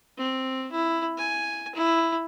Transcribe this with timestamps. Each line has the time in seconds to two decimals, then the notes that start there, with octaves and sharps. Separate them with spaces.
0.18 C4
0.72 E4
1.18 G#5
1.75 E4